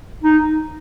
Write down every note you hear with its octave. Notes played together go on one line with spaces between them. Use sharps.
D#4